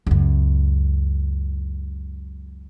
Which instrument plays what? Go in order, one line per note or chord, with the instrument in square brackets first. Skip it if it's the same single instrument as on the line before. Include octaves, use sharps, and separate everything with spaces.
[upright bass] C#2 F#2